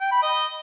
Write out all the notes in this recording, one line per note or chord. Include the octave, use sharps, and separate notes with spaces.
G5
B5
D#5